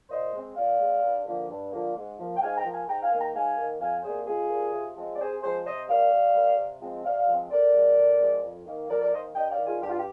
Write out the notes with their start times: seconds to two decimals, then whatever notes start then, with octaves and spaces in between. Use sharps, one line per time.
0.09 A#2 C5 D#5
0.33 G#3 C4
0.56 A#2 D5 F5
0.79 G#3 C4
1.02 G2
1.26 D3 F3 A#3
1.49 G2
1.71 D3 F3 A#3
1.95 G#2
2.18 F3 A#3
2.37 G5
2.41 G#2 F5 G#5
2.56 G5 A#5
2.65 F3 A#3
2.72 F5 G#5
2.87 G#2 G5 A#5
3.03 F5 G#5
3.10 D#3 A#3
3.18 G5 A#5
3.34 G#2 F5 G#5
3.57 D#3 A#3
3.80 F2 F5 G#5
4.03 C3 G3 A#3 G#4 C5
4.26 F2 F4 G#4
4.49 C3 G3 A#3
4.72 C3
4.96 F3 G#3 C4
5.14 D5
5.19 C3 G#4 C5
5.41 F3 G#3 C4 G#4 C5
5.65 C3 C5 D#5
5.88 G3 A#3 D5 F5
6.11 C3
6.34 G3 A#3
6.57 C3
6.80 F3 G#3 C4
7.03 C3 D5 F5
7.27 F3 G#3 C4
7.50 D3 A#4 D5
7.73 F3 G#3 C4
7.97 D3
8.19 F3 G#3 C4
8.42 F2
8.66 D#3 A#3
8.89 F2 A#4 D5
9.00 A#4 D5
9.12 D#3 A#3 C5 D#5
9.35 G2 D#5 G5
9.50 D5 F5
9.58 D#3 G3
9.66 F4 G#4
9.81 G2 G4
9.89 F4
9.97 G4